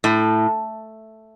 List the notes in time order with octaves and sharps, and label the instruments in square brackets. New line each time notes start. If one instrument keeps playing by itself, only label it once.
[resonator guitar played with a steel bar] A2